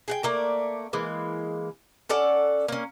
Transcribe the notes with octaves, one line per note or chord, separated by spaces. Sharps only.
G#4 F#5 G5
A3 A#3 D5
E3 G#3 A#3
C#4 A4 D5 F#5
A#3 C#4